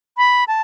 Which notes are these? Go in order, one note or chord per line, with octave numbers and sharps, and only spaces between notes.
B5
A5